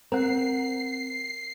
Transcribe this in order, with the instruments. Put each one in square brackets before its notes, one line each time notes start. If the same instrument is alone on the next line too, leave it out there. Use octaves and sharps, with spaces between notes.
[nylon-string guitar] C4 [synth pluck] A#4 F#5 [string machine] C7